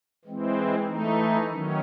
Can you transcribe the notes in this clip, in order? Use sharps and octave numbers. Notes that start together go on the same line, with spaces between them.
E3 G#3 C4
E3 A3 D#4
D#3 F#3 C#4